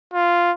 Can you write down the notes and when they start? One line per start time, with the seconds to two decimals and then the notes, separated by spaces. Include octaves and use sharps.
0.14 F4